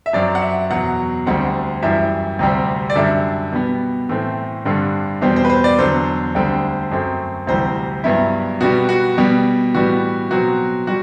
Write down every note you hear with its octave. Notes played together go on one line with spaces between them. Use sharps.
E5
F#2 F#3 C4 D5
F#5
E5
E2 B2 F#3 F#5
D2 D3 G3 C4 F#5
F#2 E3 G3 E5
D2 C3 G3 C4
D5
F#2 D3 G3 E5
B2 G3 B3
A2 E3 A3 C4
G2 D3 G3 C4
E2 B2 G3 C4 C5
C5
B4
C5
D5
E2 D3 F#3 C5
D2 D3 G3 C4
F#2 F#3 A3 C4
D2 C3 E3 G3 C5
G2 F#3 B3 E4
B2 G3 B3 F#4
F#4
B2 G3 B3
A2 E3 G3 B3 F#4
B2 F#3 C4 F#4
G3 F#4